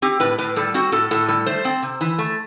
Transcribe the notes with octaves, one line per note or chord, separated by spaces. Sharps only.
C4 G4
A2 B4
A2 B4
G3 A4
C4 F#4
A2 A4
A2 A4
G3 A4
A3 C5
C4
C3
E3
A3